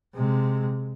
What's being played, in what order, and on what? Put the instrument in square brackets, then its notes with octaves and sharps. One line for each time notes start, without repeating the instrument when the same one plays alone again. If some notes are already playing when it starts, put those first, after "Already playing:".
[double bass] C3 G#3